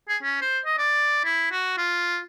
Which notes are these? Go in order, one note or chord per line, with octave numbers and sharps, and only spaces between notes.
G#4
C#4
C5
D#5
D5
E4
F#4
F4